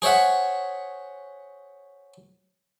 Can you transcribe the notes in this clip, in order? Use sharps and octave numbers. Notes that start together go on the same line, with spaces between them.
G#4 C5 C#5 E5 F#5